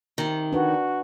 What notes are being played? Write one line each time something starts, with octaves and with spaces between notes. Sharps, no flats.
C3 D#3
D4 F#4 B4